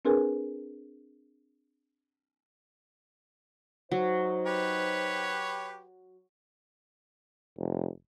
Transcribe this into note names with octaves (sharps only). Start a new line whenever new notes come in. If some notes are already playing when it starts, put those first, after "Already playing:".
C4 D4 G#4 A#4 B4 G#5
F#3 D#4 C5
G4 B4 C#5
F1